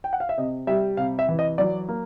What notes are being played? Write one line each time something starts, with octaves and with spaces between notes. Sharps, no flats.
G5
F#5
F5
E5
C3 D#5
G3 E5
C3 F5
E5
E3
D#5
F#3 D5
A#3